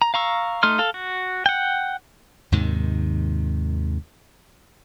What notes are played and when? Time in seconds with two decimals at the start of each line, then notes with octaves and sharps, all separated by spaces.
0.02 A#5
0.14 F5 A#5 C#6 E6
0.63 A3 D#4 C6 F6
0.79 A4 F5
0.94 F#4
1.46 F#5 G5
2.52 D#2 G#2 C3 D#3